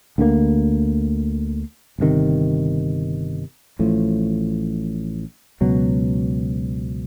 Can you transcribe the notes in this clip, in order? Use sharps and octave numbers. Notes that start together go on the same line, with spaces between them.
D2 D3 G3 A#3
G1 F2 C3 D#3
A1 A2 F3
C#2 B2 F#3